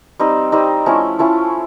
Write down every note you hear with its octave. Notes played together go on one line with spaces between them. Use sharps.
G3 C4 D#4
G3 C4 D#4
F3 A3 C#4 E4
F3 A3 C#4 E4